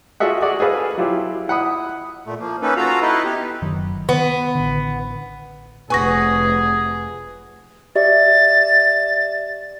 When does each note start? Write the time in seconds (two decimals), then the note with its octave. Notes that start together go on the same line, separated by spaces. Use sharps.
0.20 F4 F#4 G#4 A4 E5 F#5
0.42 F#4 G#4 D5 D#5 F#5
0.60 G#4 A4 B4 F5
0.97 F#3 E4 F4 G4
1.48 E4 F#5 B5 D#6
2.26 A#2 A3
2.39 F3 A#3
2.62 A#3 C#4 D#4 A4 B4
2.77 F4 F#4 A4 F5 A#5
3.01 D#4 E4 B4 D#5
3.25 B3 G4
3.62 F#1 D#3 F#3
4.09 D#3 B3
4.55 A1 D3
5.90 F1 G#4 B4 F#5 G#5 C#6 A#6
7.96 G4 D5 E5 A6